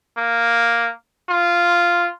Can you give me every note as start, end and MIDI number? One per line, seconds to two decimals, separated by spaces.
0.17 0.90 58
1.29 2.09 65